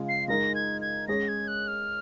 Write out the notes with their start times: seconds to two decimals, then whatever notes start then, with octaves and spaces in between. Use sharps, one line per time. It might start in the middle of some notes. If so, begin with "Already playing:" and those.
Already playing: C#3 G#3 F4
0.09 C7
0.28 G#3 D#4 A#4 D#5 A#6
0.55 G#6
0.81 G#6
1.08 G#3 C#4 G#4 C#5 A#6
1.28 G#6
1.48 F#6
1.68 F6